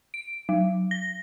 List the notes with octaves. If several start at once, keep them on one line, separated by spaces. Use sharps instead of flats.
D7
F#3
A#6